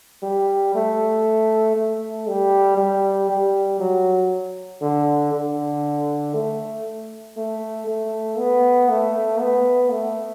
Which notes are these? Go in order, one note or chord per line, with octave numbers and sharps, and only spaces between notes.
G3
A3
A3
G3
G3
G3
F#3
D3
D3
A3
A3
A3
B3
A3
B3
A3